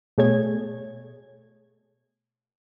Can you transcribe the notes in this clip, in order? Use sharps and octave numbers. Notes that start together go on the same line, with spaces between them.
B2 A3 G#4 C#5 G#6